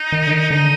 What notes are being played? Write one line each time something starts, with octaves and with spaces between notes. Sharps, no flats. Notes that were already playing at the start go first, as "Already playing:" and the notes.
Already playing: D#4
D#3
D3
D#3
D3 D#4